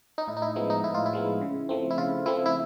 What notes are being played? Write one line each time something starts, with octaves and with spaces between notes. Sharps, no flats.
D#4
A2 E4
D#4
E4
F3 G#3 B3 D#4
D#4
A2 E4
F4
E4
F3 G#3 B3
C#3
F3 A3 C4
E4
C#3 F4
F3 A3 C4 E4
E4